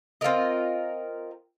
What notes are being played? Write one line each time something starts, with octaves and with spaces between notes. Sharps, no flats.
C4 F4 A#4 D#5